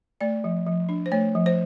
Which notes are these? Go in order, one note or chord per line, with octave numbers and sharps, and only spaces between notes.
A3 D5
F3
F3
D4
C5
A3 C#5
F3
C5